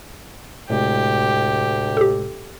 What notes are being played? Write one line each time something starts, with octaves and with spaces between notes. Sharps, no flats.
D2 A2 C3 G#3 G4
G4 A4